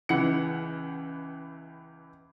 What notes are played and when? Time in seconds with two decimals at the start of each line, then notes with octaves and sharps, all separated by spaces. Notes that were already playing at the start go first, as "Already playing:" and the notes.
0.09 C#2 E3 F#5 C#7